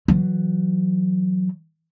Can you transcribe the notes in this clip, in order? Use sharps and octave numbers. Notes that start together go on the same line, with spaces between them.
E3 F#3